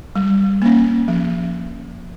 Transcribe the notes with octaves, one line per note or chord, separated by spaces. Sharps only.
G3
A#3 C#4
F3